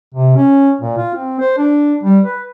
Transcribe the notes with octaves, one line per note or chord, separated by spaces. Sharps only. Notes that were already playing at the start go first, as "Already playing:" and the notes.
C3
C#4
A#2
F4
C4
C5
D4
G3
B4